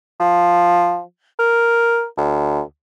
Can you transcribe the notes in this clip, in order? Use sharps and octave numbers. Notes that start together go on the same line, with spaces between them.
F3
A#4
D2